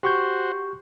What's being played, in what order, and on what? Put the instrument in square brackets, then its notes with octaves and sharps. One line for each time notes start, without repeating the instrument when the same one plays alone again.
[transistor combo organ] F#4 C5 [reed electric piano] G4 C#6 G6